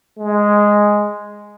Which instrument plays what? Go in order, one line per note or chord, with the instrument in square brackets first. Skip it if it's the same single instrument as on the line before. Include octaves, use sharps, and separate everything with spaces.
[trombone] G#3